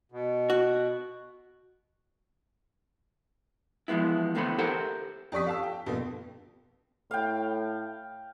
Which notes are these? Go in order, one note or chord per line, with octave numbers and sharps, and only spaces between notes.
B2
F#4
E3 F3 G#3 B3 E4
E2 A2 D3 B3 C5 B5
G4 A4 A#4 C5 F#5
F2 G4 D5 C#6 D#6 B6
F5 A5 E6
G5
A#1 F2 B2
A2 F5 G5